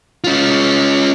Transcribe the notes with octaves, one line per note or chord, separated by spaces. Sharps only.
C#4 F4